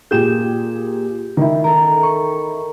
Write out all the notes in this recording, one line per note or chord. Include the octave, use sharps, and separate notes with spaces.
A#2 G4 G#4 G6 E7
D#3 E4
A4 A#4
C#6